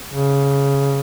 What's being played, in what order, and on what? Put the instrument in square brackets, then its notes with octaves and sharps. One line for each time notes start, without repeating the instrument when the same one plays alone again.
[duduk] C#3